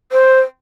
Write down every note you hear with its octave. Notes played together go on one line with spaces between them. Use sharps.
C5